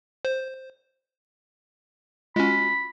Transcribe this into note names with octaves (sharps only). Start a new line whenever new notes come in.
C5
G#3 C#4 F4 F#4 B5